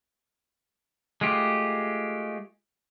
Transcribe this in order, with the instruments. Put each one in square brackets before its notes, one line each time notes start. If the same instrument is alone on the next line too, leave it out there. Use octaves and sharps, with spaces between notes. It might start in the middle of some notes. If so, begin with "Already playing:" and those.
[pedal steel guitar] G#3 A3 F4 G4